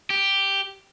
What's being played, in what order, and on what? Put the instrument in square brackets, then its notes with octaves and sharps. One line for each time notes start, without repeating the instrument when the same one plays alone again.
[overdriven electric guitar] G4